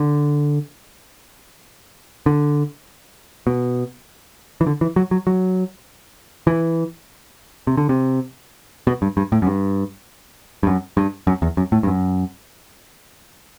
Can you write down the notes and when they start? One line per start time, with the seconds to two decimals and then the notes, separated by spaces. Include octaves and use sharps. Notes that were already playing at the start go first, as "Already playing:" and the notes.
Already playing: D3
2.26 D3
3.47 B2
4.61 E3
4.67 D3
4.81 E3
4.96 F#3
5.11 F#3
5.27 F#3
6.47 E3
7.67 C3
7.77 D3
7.89 C3
8.87 B2
9.02 G2
9.17 G2
9.32 A2
9.42 F#2
9.47 G2
10.63 G2
10.67 F#2
10.97 G2
11.27 F#2
11.42 E2
11.57 F#2
11.72 A2
11.83 G2
11.87 F#2